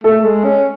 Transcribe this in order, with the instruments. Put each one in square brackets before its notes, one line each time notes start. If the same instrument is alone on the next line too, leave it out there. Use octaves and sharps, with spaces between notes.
[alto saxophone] A3 [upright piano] A4
[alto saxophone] G#3
C#4